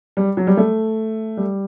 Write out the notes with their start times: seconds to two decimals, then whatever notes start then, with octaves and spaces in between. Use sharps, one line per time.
0.17 G3
0.37 F#3
0.47 G3
0.57 A3
1.37 G3